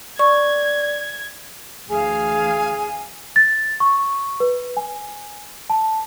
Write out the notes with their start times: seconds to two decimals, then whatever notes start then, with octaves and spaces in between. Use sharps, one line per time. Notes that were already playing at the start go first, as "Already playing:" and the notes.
0.19 D5 C#6 G#6
1.90 D2 E3 G#4 F5 G#5
3.36 A6
3.80 C#6
4.40 B4
4.77 G#5
5.70 A5